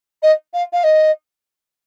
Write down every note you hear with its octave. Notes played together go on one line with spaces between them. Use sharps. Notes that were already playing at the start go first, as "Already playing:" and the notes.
D#5
F5
F5
D#5